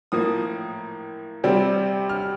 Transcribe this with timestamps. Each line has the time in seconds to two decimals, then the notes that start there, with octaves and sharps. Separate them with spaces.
0.12 A2 F3 A#3 D#6
1.44 C3 G3 C4
2.09 F6